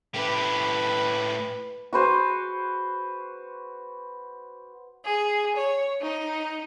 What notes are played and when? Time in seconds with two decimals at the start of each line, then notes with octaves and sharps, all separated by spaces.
0.14 A2 G4 B4
1.93 F#4 B4 C5
5.05 G#4
5.56 C#5
6.00 D#4